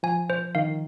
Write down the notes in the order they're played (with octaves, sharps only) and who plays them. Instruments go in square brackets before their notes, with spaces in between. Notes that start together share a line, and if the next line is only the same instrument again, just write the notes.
[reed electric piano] F3 [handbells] G#5
[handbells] C5
[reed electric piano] D#3 [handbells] F5